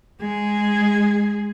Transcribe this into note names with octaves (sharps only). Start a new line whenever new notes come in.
G#3 G#4